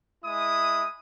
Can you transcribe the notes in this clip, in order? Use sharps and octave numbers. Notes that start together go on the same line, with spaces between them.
G#3 E4 D#6